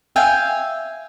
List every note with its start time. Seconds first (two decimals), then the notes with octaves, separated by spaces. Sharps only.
0.16 E5 F5 G5 G#5